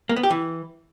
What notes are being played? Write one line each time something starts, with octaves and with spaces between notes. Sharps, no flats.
A#3
B3
G4
E3